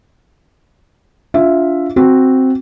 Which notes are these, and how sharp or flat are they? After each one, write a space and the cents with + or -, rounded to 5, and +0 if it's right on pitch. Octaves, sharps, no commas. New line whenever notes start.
D4 -30 F4 +0 E5 +0
C4 +0 F#4 +0